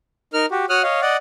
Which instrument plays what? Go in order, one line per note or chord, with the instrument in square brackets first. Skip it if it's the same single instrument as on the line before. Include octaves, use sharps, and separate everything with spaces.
[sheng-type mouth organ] D#4 A#4 F6
F#4 G4
F#4 C#5 F#5 D#6 F6 F#6
C#5 D#5 F5
D5 D#5 F#5